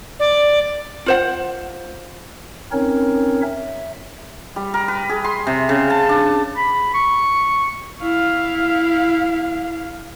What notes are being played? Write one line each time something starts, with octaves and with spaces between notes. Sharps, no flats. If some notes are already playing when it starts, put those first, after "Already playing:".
D5
F4 C5 F#5
C4 C#4 D#4 A#4 C#5
E5
G3
A#4
B4
G#4
C6
C3
C#3
A5
D4
B5
C#6
E4 F5